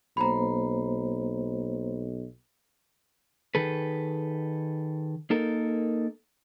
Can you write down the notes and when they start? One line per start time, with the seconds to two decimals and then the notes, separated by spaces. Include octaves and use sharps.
0.17 B1 A#3 C5 A#5 B5
3.55 D#3 G#4 A4 B4
5.30 A#3 D#4 A4 A#4